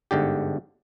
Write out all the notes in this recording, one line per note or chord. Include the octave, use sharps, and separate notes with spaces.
G1 G#2 D3 G4